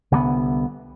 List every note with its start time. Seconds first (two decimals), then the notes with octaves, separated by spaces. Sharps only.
0.11 C2 D3 F#3 B3